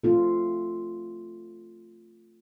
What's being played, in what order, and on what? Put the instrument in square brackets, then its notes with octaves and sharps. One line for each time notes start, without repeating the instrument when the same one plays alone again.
[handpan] A3 C4 F4 A4